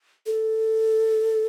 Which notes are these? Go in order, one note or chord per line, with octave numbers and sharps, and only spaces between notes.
A4